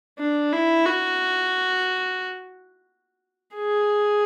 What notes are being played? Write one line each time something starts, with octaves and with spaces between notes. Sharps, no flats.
D4
E4
F#4
G#4